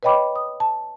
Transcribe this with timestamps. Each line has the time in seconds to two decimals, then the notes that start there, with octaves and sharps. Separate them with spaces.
0.03 B4 C#5 D#5 G5 B5 D6
0.36 D#6
0.60 A5